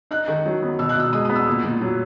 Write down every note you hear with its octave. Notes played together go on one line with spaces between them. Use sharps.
D#4 F#6
D#3
F#3
B3
B2 E6
F#6
B2 E6
G#3 D#6
B3 D#6
E6
A#2
A#2
F#3